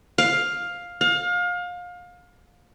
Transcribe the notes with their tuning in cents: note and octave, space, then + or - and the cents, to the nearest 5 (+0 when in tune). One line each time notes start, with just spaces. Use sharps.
F5 +10
F5 +30